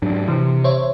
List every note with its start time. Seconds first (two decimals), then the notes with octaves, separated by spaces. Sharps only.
0.02 G#2 F#3 D4
0.28 C3 E3
0.64 C5 C#5 E5